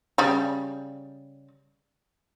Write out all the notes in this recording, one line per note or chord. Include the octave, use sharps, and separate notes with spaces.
C#3 G3